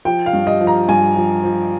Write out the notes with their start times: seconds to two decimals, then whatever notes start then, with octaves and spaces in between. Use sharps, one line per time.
0.05 F3 G5
0.26 F5
0.33 G2
0.47 D#5
0.61 F3
0.67 A#5
0.88 G2 G#5
1.16 F3
1.44 F3